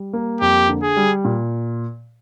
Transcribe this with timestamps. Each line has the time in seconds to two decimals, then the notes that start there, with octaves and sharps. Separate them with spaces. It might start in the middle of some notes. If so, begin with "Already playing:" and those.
Already playing: G3
0.13 A#3
0.41 F2 G4
0.69 D3
0.83 G#4
0.96 G3
1.25 A#2